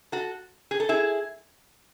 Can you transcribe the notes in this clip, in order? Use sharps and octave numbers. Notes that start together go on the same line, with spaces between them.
F#4 A4
G#4
A4
E4 G#4